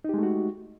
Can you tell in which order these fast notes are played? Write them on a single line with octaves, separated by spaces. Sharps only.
D#4 G4 G#3 A3 F#4